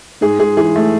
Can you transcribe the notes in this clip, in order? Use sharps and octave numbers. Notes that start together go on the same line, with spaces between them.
G#2 G#4
G#2 G#4
E3 G#4
A3